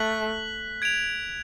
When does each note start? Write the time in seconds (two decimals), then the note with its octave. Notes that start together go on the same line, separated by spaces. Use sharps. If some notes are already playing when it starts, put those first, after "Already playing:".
Already playing: A3 F#6 B6 F#7
0.82 G#6 D7 F7